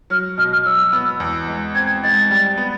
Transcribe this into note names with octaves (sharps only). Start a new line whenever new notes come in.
F#3 F6
B2 F6
F6
F#3 E6
B3
E2
G#3
C4 G#6
G#3 A6
G3
B3